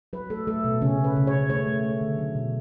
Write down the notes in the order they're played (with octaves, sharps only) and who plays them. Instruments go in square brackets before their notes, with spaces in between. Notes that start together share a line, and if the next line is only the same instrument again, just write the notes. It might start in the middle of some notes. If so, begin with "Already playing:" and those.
[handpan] F#3 B4
A3 A4
A3 A4
B2
C#3 C#4
C#3
B4
C#3
C#5
C#3
A3 C#5
A3
A3
D3
F#3
B2